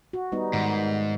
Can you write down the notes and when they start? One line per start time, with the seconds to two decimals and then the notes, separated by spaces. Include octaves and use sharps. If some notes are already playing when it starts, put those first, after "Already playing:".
0.13 F#4
0.32 G3 B3 D#4
0.53 G#2 D#3